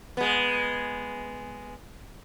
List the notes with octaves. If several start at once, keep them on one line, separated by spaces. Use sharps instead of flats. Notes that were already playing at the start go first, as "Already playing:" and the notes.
G#3 B3